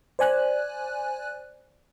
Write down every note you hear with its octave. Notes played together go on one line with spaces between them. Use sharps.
C5 D5 G#5 F#6